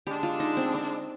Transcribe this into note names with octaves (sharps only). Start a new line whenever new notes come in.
D3 G#3 D4 G4
F4
D#4
C4
C4